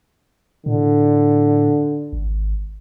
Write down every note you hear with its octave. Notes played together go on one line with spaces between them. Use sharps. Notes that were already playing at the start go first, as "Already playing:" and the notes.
A2 D3
G#1